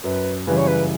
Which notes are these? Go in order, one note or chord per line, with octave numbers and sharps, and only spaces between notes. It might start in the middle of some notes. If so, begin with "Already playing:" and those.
F#2 B4
C#3 E3 G3 C#4 B4
C#5
B4